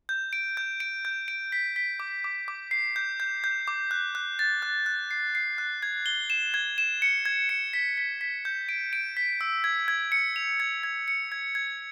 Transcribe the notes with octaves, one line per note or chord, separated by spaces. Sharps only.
G6
D7
G6
D7
G6
D7
B6
B6
D6
D6
D6
C7
G6
G6
G6
D6
F#6
F#6
A6
F#6
F#6
C7
C7
F#6
G#6
G7
E7
G#6
E7
C#7
G#6
C#7
B6
B6
B6
G6
D7
D7
B6
E6
G#6
G#6
C#7
F7
G#6
G#6
C#7
G#6
G#6